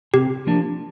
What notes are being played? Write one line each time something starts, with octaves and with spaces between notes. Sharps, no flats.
C3 G4
F3 A#3 D4